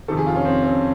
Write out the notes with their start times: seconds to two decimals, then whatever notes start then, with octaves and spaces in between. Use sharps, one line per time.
0.08 F2 C3 D#3 A4
0.17 G#4
0.26 F4
0.36 C#4
0.45 C4
0.63 C#4